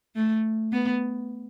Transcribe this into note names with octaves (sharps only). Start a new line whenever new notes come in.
A3
B3